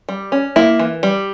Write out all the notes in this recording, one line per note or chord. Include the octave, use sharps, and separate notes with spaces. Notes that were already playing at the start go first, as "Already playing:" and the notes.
G3
C#4
A#3 E4
E3
G3